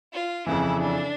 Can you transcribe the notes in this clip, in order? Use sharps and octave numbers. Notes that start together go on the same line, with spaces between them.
F4
F2 C#3 E3 E4
D4